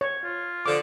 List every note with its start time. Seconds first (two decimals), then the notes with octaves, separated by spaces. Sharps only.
0.01 C#5
0.24 F4
0.66 D3 F3 D6